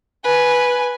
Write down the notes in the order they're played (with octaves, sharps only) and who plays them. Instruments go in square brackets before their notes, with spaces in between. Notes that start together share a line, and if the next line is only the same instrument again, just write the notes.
[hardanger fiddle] B4 G#5